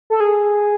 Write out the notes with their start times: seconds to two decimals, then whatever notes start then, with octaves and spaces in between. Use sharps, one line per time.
0.10 A4
0.20 G#4